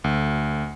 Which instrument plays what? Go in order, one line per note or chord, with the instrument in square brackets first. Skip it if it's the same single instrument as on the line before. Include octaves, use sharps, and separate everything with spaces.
[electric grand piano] D2